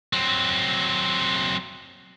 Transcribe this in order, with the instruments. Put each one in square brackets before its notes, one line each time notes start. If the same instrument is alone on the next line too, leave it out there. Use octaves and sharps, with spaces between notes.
[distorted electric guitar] F#3 C4